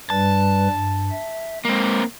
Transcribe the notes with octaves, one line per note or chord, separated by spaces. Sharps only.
G2 G3 B4 A5
G2
E5
G#3 A#3 C4